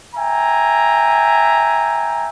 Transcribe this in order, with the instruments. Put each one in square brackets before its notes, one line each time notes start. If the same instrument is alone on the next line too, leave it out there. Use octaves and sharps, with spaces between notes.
[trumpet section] E5 G5 G#5 A#5